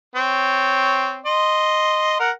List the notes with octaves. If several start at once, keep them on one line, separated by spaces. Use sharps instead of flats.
C4 C#5
D#5 C6
A#4 F#5